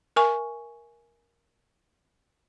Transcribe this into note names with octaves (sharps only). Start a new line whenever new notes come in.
A#4 E5 G#5 C#6